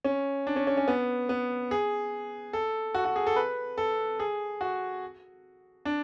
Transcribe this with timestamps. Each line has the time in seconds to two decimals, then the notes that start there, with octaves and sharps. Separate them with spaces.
0.04 C#4
0.47 D4
0.56 C#4
0.67 C#4
0.77 C#4
0.88 B3
1.29 B3
1.71 G#4
2.53 A4
2.95 F#4
3.05 F#4
3.16 G#4
3.27 A4
3.36 B4
3.78 A4
4.19 G#4
4.61 F#4
5.85 D4